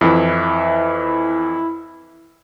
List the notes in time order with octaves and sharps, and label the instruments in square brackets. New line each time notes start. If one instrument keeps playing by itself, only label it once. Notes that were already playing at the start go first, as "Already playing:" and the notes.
[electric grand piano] F2 E3 [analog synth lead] E4